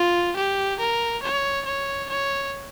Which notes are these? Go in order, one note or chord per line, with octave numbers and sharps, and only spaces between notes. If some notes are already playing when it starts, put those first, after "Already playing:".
Already playing: F4
G4
A#4
C#5
C#5
C#5